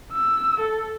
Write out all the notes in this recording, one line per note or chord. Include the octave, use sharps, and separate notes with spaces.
E6
A4